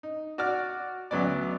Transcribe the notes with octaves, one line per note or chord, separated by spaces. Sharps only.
D#4
F#4 D5 F6
D2 F#3 B3 C#4 D5